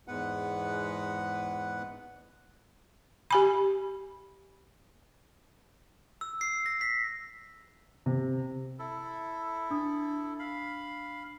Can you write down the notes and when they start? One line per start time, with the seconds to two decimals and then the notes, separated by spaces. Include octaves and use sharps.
0.08 E2 G#2 G#3 B3 B4 F#5
3.31 G4 G#5 B5
6.21 E6
6.41 C7
6.66 A#6
6.81 B6
8.06 C3
8.79 E4 A4
9.70 D4 D#6
10.39 F5 B5